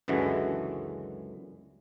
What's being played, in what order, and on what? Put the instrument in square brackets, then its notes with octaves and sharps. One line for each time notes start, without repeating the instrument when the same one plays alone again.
[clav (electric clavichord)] C#2 F#2 D3 E3 G#3 F#4